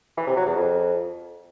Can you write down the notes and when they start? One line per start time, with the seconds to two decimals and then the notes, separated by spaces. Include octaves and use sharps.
0.17 E3
0.27 C3
0.37 F#3
0.46 E2
0.56 F2